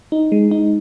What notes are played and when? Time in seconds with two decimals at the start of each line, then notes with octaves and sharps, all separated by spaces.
0.12 D#4
0.32 G#3
0.51 D#4